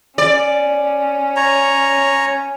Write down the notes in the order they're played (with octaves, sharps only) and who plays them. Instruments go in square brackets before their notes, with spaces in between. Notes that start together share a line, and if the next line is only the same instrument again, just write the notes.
[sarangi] C#4 [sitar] D5
[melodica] C#5 A#5